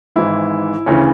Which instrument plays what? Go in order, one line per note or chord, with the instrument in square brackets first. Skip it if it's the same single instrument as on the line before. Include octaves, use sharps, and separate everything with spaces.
[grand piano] G#1 G#2 E3 E4
D2 C#3 E3 C#4